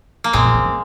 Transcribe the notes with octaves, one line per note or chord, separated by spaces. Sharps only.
A#3
A#2 G#3 C4
A#2
C#3
C#3